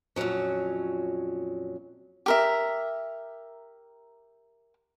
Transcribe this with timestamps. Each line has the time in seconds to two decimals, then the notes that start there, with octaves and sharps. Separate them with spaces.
0.16 F2 A#2 E3 F#3 C#4
2.26 G4 A#4 E5